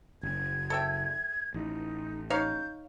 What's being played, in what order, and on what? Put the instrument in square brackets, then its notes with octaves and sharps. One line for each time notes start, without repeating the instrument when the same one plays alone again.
[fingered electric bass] F#1 [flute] G#6
[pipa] A4 E5 G5
[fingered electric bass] A1 [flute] D#4
[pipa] D#4 C#5 F5 [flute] G6